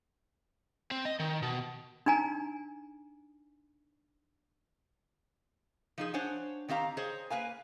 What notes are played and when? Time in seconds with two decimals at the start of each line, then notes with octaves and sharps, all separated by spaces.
0.91 C4
1.05 D#5
1.19 D#3
1.42 B2
2.06 D4 D#4 G#5 A#5
5.98 F3 D#4 G#4
6.14 D4 C5 C#5 F#5 G#5
6.68 D#3 C4 G4 F5 A#5
6.97 G#4 C5 C#5 D#5
7.30 A#3 B4 F5 G#5